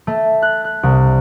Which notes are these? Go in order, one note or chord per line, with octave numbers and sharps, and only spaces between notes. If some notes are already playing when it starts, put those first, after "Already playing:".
A3
F#6
F#6
C2